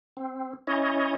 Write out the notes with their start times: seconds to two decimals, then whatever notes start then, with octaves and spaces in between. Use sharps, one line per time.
0.17 C4
0.67 C#4 E4 C#5 D#5